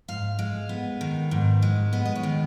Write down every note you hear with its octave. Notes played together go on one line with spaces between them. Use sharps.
G#2 F5
G#3
B3
D#3
G#2
G#3
B3 D#5
D#5
C#5
D#3